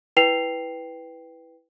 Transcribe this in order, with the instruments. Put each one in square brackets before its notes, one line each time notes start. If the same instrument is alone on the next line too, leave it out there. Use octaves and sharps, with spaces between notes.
[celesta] E4 B4 G5 C7 F7